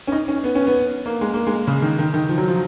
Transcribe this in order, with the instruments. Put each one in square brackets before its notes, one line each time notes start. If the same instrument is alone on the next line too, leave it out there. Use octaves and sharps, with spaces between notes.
[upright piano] C#4
D#4
C#4
B3
C#4
B3
A#3
G#3
A#3
G#3
C#3
D#3
D#3
D#3
F3
F#3
F3